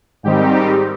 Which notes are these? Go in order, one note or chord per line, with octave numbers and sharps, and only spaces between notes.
G#2 D#3 G3 C4 D#4 G4